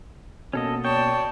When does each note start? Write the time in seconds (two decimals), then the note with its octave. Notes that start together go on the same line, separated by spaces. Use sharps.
0.53 B2 A#3 C#4 A4 D#5
0.85 C#5 D5 G5 A5